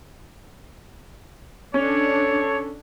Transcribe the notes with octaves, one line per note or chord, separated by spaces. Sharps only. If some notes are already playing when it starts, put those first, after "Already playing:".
C#4 D4 A4 C#5